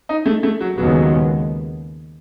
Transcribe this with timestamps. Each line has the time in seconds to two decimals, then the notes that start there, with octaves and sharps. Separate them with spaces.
0.09 D#4
0.26 A3
0.43 A3
0.61 F#3
0.78 D#2 C#3 F#3 G#3 B3